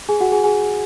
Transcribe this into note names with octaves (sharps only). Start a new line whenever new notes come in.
G#4 G#5
F#4 F#5
G#4 G#5
G#4 G#5